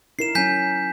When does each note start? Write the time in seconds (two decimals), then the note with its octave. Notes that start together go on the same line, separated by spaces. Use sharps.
0.19 D#4 E4 A#4 C7 E7
0.35 F#3 C#4 G#5 G6 B6